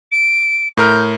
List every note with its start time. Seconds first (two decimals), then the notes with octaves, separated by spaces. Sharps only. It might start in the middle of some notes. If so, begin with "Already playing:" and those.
0.11 D7
0.77 A2 A#4 F6 G6